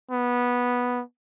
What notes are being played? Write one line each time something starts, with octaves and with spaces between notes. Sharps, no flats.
B3